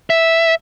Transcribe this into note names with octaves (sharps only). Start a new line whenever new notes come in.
E5